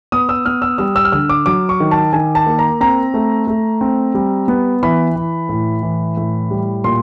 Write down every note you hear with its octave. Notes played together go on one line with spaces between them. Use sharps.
B3 D#6
E6
B3 F6
E6
G3 E6
E6
F6
D3 E6
D6
F#3 D6
C#6
D#3
A5
D#3 G#5
A5
A#3
A#5
C4 A#5
A3
A3
C4
G3
B3
E3 B5
E3
A2
E3
A2
G3
A#2 C6